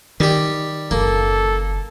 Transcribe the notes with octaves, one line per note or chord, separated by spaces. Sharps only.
D#3 G3 G4
F#1 A#3 A4